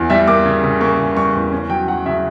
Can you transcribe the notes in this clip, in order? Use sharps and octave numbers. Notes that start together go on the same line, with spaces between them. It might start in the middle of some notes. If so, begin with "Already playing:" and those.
Already playing: E2
G3 E5
A#3 D6
C#3
C#3
A#3 C#6
C#3
G3 C#6
E2
C#4
F#3 G5
F#3 F#5
C#3 E5